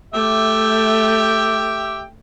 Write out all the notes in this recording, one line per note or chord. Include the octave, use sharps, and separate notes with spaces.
A3 G4 E5 G5